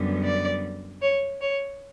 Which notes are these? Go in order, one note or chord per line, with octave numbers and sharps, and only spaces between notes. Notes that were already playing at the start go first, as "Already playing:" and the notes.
Already playing: F#2 D3 G3 B3
D5
C#5
C#5